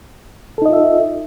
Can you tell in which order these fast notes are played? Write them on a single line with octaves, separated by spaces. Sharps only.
A4 D#4 D#5 F4 E5